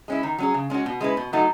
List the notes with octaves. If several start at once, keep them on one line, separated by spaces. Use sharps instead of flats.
G#3 C#4 E4
D#3
F#3 C#4 G#4
C#3
G#3 C#4 F#4
B2
G#3 C#4 E4 B4
B2
F#3 A3 D#4 F#4